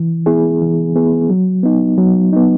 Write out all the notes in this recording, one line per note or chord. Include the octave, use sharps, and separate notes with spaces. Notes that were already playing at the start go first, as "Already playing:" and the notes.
Already playing: E3
B3 E4 G#4
E3
B3 E4 G#4
F#3
B3 D#4
F#3
B3 D#4